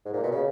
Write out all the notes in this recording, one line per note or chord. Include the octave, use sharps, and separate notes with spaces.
G#2
A#2
B2
C#3